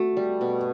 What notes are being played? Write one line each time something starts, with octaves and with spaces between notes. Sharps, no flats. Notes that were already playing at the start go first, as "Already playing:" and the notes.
Already playing: A3 F#4
G3
B2